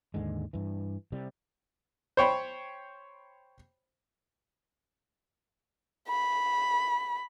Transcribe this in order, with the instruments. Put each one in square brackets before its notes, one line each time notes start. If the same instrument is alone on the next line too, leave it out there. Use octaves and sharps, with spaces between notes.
[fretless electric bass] D#2 G#2 D3 G#3
G2 E3
C3 G3
[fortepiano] C5 C#5 G5 B5
[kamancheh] B5